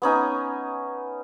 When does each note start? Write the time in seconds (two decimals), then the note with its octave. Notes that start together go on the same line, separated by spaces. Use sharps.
0.02 B3 C#4 D#4 G#5